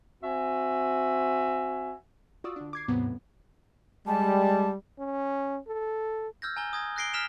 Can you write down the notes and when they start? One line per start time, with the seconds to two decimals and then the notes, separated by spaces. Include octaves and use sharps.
0.23 C4 F#4 E5 G#5
2.44 F4 F#4 D5 C#6 D#6 E6
2.56 D3 D4
2.73 D6 G#6 C7
2.88 D#2 G#2 C3 F#3 B3 C4
3.05 A2
4.07 G3 G#3 A5
4.99 C#4
5.67 A4
6.42 E6 F6 G6 G#6 A#6
6.56 G#5 A#5 G7
6.73 D#6 G#6 A#6
6.96 F#6 G6 A#6 C7 D7 G7
7.13 F6 B6 E7 F7 G7